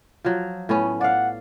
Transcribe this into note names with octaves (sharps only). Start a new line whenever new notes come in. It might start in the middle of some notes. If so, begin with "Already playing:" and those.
F3 F#3
A2 B3 C#4
D5 F5 F#5